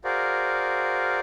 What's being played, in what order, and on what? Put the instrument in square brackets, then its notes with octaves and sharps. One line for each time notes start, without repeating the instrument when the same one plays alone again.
[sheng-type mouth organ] F#4 G#4 A#4 C5 D5 F5